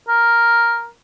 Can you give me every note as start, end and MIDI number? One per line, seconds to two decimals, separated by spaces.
0.08 0.87 70